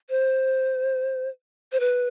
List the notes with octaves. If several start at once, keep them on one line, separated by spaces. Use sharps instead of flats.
C5
C5
B4